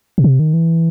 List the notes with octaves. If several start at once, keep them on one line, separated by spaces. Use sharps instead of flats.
B2
C3
D#3
E3